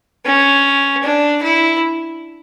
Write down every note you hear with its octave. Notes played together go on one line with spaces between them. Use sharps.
C#4
D4
E4